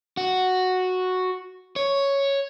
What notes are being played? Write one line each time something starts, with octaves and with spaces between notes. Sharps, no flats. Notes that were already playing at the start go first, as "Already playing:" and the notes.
F#4
C#5